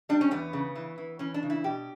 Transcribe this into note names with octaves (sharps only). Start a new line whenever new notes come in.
G3 D4
C#4
E2 B3
C#3
E3
E3
E3 C#4
D4
C#3
E4
B2 G4